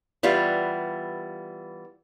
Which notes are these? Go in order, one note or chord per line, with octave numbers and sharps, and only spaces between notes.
E3 G3 B3 F4